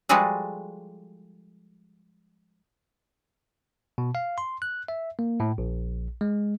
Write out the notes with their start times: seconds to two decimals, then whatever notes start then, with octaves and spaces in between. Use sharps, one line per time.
0.09 F3 G3 G#3 F#4 G#4 A4
3.98 B2
4.15 F5
4.38 C6
4.62 F#6
4.88 E5
5.19 A#3
5.40 A2
5.58 A#1
6.21 G#3